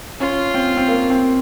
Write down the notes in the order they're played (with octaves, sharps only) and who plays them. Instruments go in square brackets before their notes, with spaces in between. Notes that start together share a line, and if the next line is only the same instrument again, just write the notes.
[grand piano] C#4 [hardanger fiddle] F4
[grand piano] C4
C4
A#3
C4